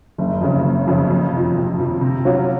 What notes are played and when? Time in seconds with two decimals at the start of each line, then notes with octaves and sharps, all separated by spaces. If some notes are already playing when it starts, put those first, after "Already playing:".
0.18 F#1
0.41 F2 C#3
0.64 F#1
0.87 F2 C#3
1.10 F2
1.33 C3 F3
1.56 F2
1.79 C3 F3
2.01 C3
2.25 F#3 C#4 F4